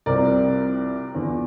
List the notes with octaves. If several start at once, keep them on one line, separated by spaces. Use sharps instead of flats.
C2 C3 F3 C4 A#4 D5
E2 D3 F3